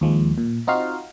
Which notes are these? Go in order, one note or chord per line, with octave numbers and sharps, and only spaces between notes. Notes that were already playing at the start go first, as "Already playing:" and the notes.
D#2 F3 G#3
A#2
C4 D#4 F4 F#4 F5